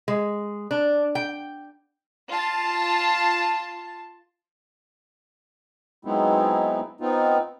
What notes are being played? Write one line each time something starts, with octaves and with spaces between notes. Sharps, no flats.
G#3
D4
G5
F4 A5
F#3 G#3 B3 C4 D#4 E4
B3 C4 D#4 F4